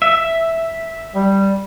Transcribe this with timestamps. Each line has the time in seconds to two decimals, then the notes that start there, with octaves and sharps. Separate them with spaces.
0.02 E5
1.15 G3